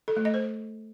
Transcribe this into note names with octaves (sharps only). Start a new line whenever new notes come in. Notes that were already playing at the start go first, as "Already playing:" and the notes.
A4
A3
D#5
C5